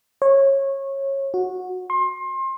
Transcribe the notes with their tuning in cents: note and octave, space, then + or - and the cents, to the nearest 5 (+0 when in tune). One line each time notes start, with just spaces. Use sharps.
C#5 -20
F#4 -15
C6 +30